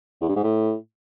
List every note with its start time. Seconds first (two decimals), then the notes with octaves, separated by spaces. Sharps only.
0.21 E2
0.29 G2
0.36 G#2
0.44 A2